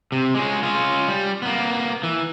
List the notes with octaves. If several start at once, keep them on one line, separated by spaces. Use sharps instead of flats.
C3
G#3 C#4
C#4 F4
G3
A#3 B3
E3